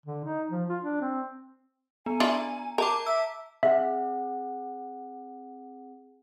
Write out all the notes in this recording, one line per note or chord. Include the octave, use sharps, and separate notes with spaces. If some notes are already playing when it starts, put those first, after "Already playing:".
D3
D#4
F3
F4
D4
C4
B3 G#5
D4 E4 F4 A#5
A#4 A5 A#5 D6
E5 E6
C4 G#4 E5 F#5